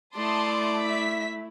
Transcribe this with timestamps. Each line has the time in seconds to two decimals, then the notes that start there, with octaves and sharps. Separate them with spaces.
0.16 A3 E4 D5 A5 C6 D#6
0.82 E5 B6